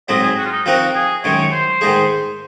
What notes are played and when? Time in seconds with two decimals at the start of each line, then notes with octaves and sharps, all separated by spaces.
0.08 G#2 F#3 C4 D#5
0.23 G#4
0.38 F#4
0.45 F4
0.51 D#4
0.66 F3 C4 D#4 F#4 A#4
0.95 G#4
1.24 F#2 D#3 G#3 C#5
1.52 C5
1.81 G#2 D#3 G#3 D#4 G#4